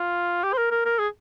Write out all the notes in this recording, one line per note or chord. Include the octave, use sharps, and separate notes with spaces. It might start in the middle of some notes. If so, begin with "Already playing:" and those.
Already playing: F4
G4
C5
A#4
A#4
A#4
G#4